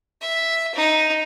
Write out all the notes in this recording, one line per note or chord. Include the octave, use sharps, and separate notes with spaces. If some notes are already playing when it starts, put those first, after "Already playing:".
E5
D#4